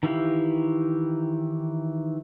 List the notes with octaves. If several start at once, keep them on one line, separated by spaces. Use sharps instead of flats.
D#3 E3 E4 G4 F5